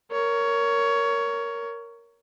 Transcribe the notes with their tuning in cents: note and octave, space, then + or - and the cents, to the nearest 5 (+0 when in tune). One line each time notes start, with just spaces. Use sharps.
A#4 +0 C#5 +15